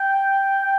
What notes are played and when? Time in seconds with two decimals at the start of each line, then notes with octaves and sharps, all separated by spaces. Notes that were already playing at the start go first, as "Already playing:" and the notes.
Already playing: G5
0.64 G5